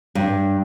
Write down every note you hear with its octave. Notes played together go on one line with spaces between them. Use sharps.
G2